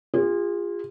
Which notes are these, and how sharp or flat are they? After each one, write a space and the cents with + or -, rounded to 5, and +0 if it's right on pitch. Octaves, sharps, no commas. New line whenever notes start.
F4 +0 G#4 -35